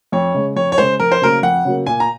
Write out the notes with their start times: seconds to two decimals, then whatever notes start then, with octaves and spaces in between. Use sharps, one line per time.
0.12 F2 C#5
0.34 C#3 G#3
0.56 F2 C#5
0.72 C#5
0.78 C#3 G#3 C5
1.00 F2 A#4
1.12 C5
1.22 C#3 F#3 A#3 A#4
1.43 F2 F#5
1.65 C#3 F#3 A#3
1.86 A#2 G#5
2.00 A#5